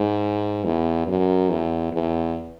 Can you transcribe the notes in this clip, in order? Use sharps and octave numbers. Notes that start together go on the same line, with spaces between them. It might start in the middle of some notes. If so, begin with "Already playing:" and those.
Already playing: G#2
E2
F#2
E2
E2